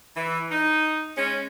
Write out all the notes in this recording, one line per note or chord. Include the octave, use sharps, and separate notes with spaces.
E3
D#4
G#3 C#4